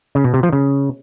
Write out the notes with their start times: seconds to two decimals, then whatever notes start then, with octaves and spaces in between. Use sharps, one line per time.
0.15 C#3
0.24 B2
0.34 C3
0.43 F3
0.53 C#3